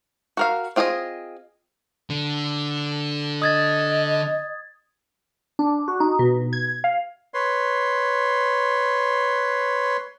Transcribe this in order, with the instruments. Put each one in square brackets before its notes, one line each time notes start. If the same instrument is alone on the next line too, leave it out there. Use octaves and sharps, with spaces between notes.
[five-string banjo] F#4 A#4 F5
C4 F4 G#4 D5 D#5
[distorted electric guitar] D3
[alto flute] D#5 [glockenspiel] D#6 G#6 A6
[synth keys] D4
F#4
D#4
B2
G#6
F5
[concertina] B4 C#5 C6